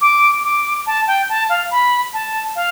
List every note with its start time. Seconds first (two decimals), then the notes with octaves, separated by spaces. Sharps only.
0.01 D6
0.44 D6
0.87 A5
1.07 G5
1.29 A5
1.49 F5
1.71 B5
2.14 A5
2.56 F5